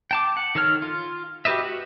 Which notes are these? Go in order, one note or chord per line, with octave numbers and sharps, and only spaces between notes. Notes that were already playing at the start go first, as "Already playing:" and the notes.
G5 A5 D6
F#5
D#3 A4 C#5 F6
F4
F#4 G4 B4 D#5 E5
F#4